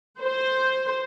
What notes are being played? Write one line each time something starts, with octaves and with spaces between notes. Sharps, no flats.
C5